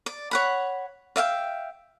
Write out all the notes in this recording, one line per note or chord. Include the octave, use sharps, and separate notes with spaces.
D5
C#5 F#5 B5
D5 E5 F5 G5